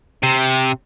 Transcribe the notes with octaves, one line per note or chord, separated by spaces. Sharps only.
C3